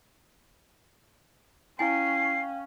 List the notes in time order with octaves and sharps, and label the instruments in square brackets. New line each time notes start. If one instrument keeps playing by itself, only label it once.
[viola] C#4 [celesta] E4 G#5 [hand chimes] F5 G5 [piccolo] C7